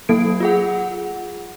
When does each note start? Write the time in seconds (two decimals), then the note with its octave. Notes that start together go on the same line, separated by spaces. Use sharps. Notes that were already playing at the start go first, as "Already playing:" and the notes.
0.09 F#3 A#3 A4 D7
0.40 F4 G#4 F#5